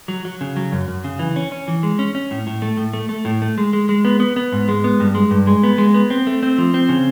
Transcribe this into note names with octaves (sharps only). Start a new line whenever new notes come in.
F#3
F#3
C#3
F#3
F#2
F#2
C#3
E3
C#4
C#4
E3
G#3
C#4
C#4
A2
A2
A3
A2
A3
A3
A2
A3
G#3
G#3
G#3
B3
B3
B3
G#2
G#3
B3
G2
G#3
G2
G#3
B3
G#3
B3
C4
A3
C4
F3
C4
C#3